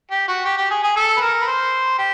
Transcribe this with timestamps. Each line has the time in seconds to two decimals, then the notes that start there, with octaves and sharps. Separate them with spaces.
0.11 G4
0.28 F#4
0.45 G4
0.57 G4
0.70 G#4
0.83 G#4
0.96 A4
1.16 B4
1.21 A#4
1.42 B4
1.47 C5
1.98 G4